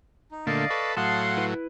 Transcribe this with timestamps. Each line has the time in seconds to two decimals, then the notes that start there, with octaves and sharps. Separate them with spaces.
0.32 D#4
0.47 A#2 D3 A3 D5 D#5 F5
0.70 A4 B4 C#6
0.97 A2 F#3 F5 F#5 A5 C6 D#6
1.37 E4 B4